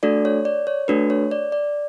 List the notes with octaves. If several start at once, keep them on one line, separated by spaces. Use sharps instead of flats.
A3 D4 F#4 A4 D5
C#5
D5
C#5
A3 D4 F#4 A4 B4
C#5
D5
D5